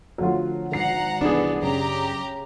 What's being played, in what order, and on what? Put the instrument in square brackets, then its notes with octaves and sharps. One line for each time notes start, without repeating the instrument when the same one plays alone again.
[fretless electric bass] D3 F3 [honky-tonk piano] F#3 A3 F4
[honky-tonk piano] G#1 C7 [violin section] F#5 A#5
[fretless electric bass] C2 E3 [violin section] B3 A4 [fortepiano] D4 G#4
[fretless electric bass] F#2 [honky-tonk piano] C#3 [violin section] G4 A#5